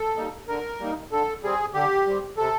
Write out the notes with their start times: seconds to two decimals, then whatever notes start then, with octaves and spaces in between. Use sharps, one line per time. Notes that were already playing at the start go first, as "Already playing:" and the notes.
Already playing: A4
0.16 G3 A#3 D#4
0.48 D3 A#4
0.80 G3 A#3 D#4
1.12 D3 A4
1.43 G3 C4 G#4
1.74 D3 G4
2.07 G3 C4
2.37 C3 A4